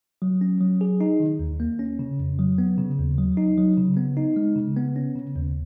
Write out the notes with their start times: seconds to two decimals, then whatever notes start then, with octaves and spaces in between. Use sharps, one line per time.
0.22 F#3
0.41 C#4
0.61 F#3
0.81 G#4
1.01 D#4
1.20 D#3
1.39 D#2
1.60 A#3
1.79 C#4
1.99 C#3
2.19 F2
2.39 F#3
2.58 B3
2.78 C#3
2.98 D#2
3.18 F#3
3.37 D#4
3.58 F#3
3.77 C#3
3.97 B3
4.17 D#4
4.36 G#3
4.56 C#3
4.76 B3
4.96 C#4
5.15 C#3
5.36 D#2